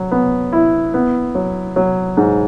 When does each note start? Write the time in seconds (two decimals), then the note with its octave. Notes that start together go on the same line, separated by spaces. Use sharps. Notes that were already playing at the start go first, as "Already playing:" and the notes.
Already playing: F#3
0.11 B3
0.53 E4
0.94 B3
1.35 F#3
1.76 F#3
2.17 G#2